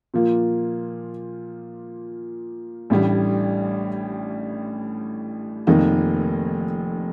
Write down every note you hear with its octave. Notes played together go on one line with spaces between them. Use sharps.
A#2 F3 A#3 F4
A1 A2 G3 D4
F1 F2 D#3 A#3 D#4